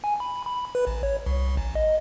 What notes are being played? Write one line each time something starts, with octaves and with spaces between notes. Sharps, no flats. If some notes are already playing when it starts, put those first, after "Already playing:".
G#5
B5
B5
B4
A1
C#5
C2
A1
D#5